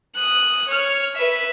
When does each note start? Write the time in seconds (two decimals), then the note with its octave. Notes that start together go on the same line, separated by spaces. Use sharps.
0.15 D#6 F#6
0.68 C#5 F6
1.16 B4 E5